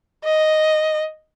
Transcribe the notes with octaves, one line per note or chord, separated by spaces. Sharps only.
D#5